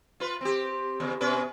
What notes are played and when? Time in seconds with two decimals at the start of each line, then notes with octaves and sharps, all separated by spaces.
0.20 F4 B4
0.41 C4 G4
1.00 E2 C#3
1.21 B2 C#4 B4